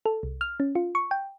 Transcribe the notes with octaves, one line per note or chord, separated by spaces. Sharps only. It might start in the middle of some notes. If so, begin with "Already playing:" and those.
A4
C2
F6
C#4
F4
C#6
G5